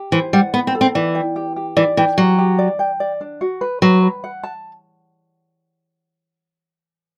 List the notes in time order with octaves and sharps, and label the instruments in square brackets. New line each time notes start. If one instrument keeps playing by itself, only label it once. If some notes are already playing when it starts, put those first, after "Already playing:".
Already playing: [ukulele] G4
[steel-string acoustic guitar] E3 [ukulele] C5
[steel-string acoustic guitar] G3 [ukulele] F#5
[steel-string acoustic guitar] B3 [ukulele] B5
[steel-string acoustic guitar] C4
[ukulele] A4
[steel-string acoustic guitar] C4
[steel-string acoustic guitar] E3 [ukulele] D5
[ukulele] G5
G4
G4
[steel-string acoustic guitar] E3 [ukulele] D5
[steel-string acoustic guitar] E3 [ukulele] G5
[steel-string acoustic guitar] F#3 [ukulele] G4
[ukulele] G4
D5
G5
D5
D4
F#4
B4
[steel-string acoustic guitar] F#3 [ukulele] B4
[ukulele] B4
F#5
A5